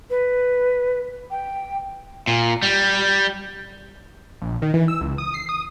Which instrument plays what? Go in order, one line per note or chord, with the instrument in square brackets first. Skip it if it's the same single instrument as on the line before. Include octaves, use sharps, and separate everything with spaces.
[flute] B4
G5
[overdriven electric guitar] A#2
G3
[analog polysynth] A#1
D#3
E3
E6
C#2
D#6
C7
D#6